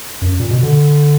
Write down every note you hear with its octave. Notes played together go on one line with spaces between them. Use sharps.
F#2
A#2
B2
D3